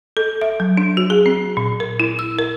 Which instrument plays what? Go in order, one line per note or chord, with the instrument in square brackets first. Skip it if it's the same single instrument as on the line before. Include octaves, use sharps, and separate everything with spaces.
[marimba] A4
E5
F#3
D4
F#4
G#4
C4
A#2
A#4
E4
E6
A#4